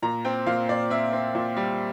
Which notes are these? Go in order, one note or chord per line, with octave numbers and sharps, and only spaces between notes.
A#2 A#5
C4 G5
A#2 F5
A#2 D5
C4 E5
C4
A#2
G3